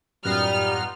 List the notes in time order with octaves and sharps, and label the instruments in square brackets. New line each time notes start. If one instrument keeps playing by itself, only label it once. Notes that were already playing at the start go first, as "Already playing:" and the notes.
[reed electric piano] F#2 A2 [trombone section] G3 [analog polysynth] B3 D#4 F4 [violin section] F6